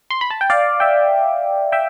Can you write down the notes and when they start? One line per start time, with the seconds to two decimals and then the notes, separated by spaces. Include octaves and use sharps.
0.10 C6
0.21 B5
0.31 A5
0.41 G5
0.50 D5 F5
0.80 E5 G5
1.72 E5 G5